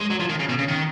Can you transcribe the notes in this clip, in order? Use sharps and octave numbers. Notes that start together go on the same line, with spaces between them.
G#3
F#3
F3
D#3
C#3
B2
C#3
D#3